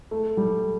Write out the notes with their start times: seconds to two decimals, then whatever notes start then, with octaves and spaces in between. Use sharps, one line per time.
0.11 A3
0.37 G3